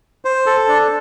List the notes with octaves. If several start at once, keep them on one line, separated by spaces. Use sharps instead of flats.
C5
A4
D4